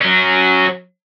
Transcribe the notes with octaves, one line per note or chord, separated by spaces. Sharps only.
F#3 C#4